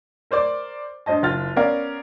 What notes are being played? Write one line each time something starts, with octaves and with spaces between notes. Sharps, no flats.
A#4 C5 D5 D6
G2 C5 D#5 A5
F#1 F4 F6 A6
B3 C#4 A#4 D5 F5